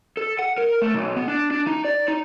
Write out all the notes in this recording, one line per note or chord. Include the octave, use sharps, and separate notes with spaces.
A4
F#5
A#4
A3
B1
B3
D4
D4
D#4
D5
D#4